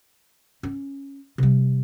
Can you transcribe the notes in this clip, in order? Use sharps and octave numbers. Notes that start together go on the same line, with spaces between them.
C#4
C3 G3